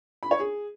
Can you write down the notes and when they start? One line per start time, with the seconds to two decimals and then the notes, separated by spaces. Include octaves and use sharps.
0.23 B5
0.31 C#5
0.40 G#4